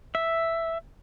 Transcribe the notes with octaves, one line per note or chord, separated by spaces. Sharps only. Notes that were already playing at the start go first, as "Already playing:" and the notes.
E5